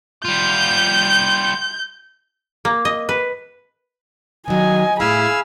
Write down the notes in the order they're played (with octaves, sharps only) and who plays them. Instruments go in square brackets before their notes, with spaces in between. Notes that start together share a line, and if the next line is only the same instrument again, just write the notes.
[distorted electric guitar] G3 F4 [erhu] G6
[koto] A#3
D#5
B4
[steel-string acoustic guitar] D#3 F#3 [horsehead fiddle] D#5 G#5
[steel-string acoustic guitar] A2 E4 [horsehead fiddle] G#4 B5 [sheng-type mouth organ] F5 G#5 E6